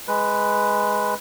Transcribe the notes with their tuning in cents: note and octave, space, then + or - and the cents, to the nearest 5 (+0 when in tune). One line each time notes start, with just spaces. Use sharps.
G#3 +0 B4 +0